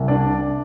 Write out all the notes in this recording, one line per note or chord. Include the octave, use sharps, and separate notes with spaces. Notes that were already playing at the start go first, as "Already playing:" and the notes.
Already playing: C2
D4 D5